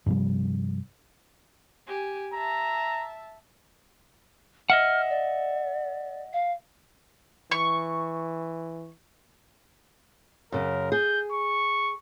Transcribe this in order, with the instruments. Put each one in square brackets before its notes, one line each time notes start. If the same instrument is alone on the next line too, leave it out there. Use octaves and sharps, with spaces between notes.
[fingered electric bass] G2 C3 F3 G3
[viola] G4 G#5
[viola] E5 A5 [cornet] A#5
[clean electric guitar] D#5 E5 F#5 [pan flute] F6
[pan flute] D5
F5
[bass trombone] E3 [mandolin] C#6
[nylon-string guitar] F#2 C#3 [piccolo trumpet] A#4
[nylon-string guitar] G#4 [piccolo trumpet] G6
[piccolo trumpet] C#6